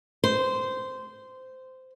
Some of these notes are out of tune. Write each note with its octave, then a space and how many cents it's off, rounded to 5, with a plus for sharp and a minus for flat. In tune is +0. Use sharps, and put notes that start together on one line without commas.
C5 -15